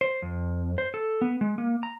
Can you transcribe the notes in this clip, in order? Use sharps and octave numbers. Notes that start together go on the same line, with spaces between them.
C5
F2
C5
A4
B3
G#3
A#3
A#5